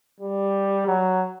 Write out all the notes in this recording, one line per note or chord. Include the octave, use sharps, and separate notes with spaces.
G3
F#3